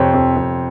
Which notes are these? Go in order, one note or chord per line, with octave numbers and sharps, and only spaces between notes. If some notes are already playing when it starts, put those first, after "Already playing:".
Already playing: F2 C3 C5 C#5
F2
F2